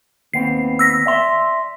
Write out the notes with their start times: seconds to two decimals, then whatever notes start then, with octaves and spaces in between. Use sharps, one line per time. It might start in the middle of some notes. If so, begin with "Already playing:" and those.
0.34 D#2 B3 C4 C7
0.79 E6 A#6 B6
1.06 D5 E5 C6